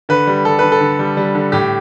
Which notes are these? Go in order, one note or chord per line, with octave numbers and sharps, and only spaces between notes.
D3 B4
G3
G3 A4
D3 B4
A4
D3
G3
G3
D3
A2 G4